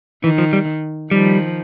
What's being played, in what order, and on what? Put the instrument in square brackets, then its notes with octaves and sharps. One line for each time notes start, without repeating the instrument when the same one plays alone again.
[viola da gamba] D#3 [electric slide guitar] E3
[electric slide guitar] F3
G3
[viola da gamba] D#3 F3 [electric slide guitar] G3